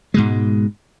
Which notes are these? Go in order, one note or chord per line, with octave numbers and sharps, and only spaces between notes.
G#2 B2 G#3